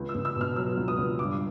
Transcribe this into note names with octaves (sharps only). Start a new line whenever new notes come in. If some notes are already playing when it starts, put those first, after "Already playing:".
Already playing: C#2
E6
C#2
E6
B2
F6
F#3 E6
C#2
D#6
C#2
G2 D6